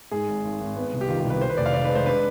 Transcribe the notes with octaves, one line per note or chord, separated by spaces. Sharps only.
G#2 G#4
G#1
G#1
G#1
B3
C2
G4
D#3 F4
C2 G4
B4
D#3 C5
B4
F1 D5
F5
D#3 D5
B4
G#3
C5
D4 B4